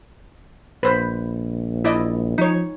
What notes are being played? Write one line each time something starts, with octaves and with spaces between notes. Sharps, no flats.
A#1 B4 C5
E4 D5 D#5
F3 D#4 C#5